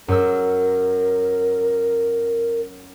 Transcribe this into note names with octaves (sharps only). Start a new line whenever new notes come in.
F#2 A#4 E6